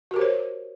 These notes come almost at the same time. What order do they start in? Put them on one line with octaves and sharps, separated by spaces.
F#4 A#4 G4 C5 C#5